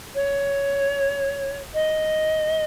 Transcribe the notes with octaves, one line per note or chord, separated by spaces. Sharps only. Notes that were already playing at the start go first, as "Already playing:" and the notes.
C#5
D#5